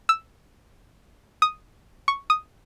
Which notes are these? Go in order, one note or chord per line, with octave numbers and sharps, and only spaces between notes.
E6
D#6
C#6
D#6